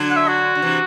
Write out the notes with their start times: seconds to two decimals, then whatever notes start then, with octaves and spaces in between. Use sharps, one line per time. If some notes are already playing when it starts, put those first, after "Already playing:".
Already playing: D3 F#3
0.11 F#5
0.16 E5
0.28 F#4
0.55 D3
0.62 C3 E3